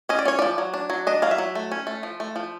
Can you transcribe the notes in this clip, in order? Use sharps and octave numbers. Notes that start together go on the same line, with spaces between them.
C#4 D#5
D5
C#4 C#5
F3 D5
F#3
D4
F#3
D4 D#5
F#3 F5
E5
F#3
A3
C#4
A3
F3
A3
F3